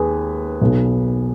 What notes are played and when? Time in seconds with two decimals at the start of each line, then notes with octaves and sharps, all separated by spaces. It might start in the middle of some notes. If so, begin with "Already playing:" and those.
Already playing: D#2 G#4 B4
0.61 B1 B2